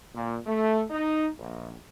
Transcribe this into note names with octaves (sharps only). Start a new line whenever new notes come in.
A#2
A3
D#4
A#1